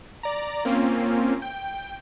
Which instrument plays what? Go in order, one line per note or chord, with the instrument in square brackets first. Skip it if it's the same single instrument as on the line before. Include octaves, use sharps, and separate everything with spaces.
[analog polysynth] D5 A#5
A#3 C4 C#4 F4
G5